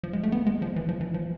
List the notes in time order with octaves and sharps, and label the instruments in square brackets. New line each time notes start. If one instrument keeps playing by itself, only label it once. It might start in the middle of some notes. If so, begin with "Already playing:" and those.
[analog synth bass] F3
G#3
A3
B3
G#3
F3
E3
F3
E3
F3